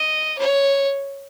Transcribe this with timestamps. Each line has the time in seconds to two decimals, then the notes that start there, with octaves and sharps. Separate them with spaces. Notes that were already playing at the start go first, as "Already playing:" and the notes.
Already playing: D#5
0.38 C#5